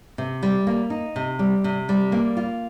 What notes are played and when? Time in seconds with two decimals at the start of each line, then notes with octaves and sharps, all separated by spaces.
0.18 C3
0.43 G3
0.67 A#3
0.90 D#4
1.16 C3
1.39 G3
1.64 C3
1.89 G3
2.12 A#3
2.37 F4